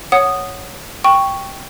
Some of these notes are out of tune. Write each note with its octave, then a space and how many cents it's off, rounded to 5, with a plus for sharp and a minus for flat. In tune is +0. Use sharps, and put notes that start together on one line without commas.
C#5 +0 F#5 +0 D#6 -10
G5 +0 C#6 +0